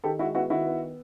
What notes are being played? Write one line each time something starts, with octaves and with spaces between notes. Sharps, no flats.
D#3 G4 A4
G#3 E4 F#4
B3 E4 F#4
D#3 E4 F#4
B3